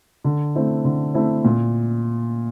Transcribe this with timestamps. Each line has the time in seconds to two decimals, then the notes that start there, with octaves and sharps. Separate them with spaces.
0.24 D3
0.55 A3 C4 E4
0.85 D3
1.14 A3 C4 E4
1.44 A#2